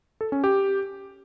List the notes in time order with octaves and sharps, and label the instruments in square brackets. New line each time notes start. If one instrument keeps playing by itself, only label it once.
[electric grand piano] A4
C#4
G4